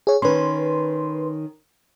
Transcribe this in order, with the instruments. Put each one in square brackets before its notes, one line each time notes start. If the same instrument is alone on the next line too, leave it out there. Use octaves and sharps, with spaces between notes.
[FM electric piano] G#4 C#5
[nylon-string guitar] D#3 C#4 [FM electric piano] B4 C6